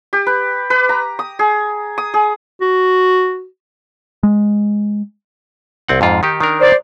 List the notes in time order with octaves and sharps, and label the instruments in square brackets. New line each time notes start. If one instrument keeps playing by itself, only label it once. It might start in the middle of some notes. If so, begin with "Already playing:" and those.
[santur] G4
B4
B4
A#5
D#6
G#4
D#6
G#4
[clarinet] F#4
[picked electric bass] G#3
[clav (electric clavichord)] C2 C4 F#5
F2 G#2 F4
D#3 D#4 G4
D#3 D4 A#4
[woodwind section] C5 D5